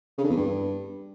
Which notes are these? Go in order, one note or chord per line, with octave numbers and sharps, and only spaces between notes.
C#3
D3
E2
G2